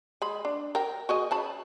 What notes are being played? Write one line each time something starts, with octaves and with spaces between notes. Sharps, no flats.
G#3 B5
D4
A#4 G5
F#4 G#4 D#5
C#3 A5 B5